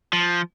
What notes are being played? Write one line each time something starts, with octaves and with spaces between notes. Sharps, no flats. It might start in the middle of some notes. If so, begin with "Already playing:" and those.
F3